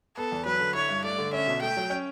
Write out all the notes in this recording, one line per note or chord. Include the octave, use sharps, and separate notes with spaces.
B3 A4
E2
F#3 B4
D3
E4 C#5
G2
A3 D5
D3
C#4 E5
B2
A3 G5
F#3
C#4